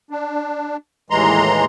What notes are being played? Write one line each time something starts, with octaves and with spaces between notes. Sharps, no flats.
D4
D#2 A2 E3 G#3 A#5 C6